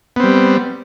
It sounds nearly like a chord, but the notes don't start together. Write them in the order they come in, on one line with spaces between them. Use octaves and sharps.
B3 C4 G3